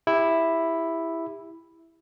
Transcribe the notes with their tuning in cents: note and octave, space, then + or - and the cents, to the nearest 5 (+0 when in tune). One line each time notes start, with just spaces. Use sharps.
E4 +0 G4 +25